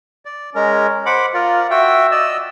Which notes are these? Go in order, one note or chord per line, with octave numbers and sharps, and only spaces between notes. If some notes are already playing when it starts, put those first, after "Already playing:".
D5
G#3 C#4 A#4
C5 F#5 B5 D6
F4 A#4 D5
F#4 E5 G5
D5 D#5 E6